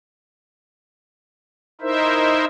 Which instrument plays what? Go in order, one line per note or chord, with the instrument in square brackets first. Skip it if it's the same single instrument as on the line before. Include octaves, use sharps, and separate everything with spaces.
[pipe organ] D#4 E4 A#4 C5 E5